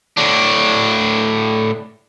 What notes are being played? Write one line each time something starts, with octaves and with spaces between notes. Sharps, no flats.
A2 D4